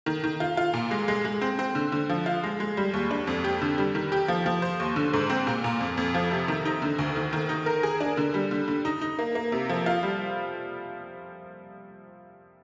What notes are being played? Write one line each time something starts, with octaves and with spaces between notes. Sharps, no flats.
D#3
D#3
F4
F4
A#2
G#3
G#3
G#3
C4
C4
D3
D3
F3
F4
G#3
G#3
G3
D#2
D4
F2
G4
D3
G3
D#3
G4
F3
F3
C5
D#2
D3
G#2
C4
A#2
A#2
F2
F2
F3
C3
D#3
D#4
D3
D2
D#3
D#3
D#4
A#4
G#4
D4
D3
G3
D3
D3
D#4
D#4
A#3
A#3
C3
F3
F4
G3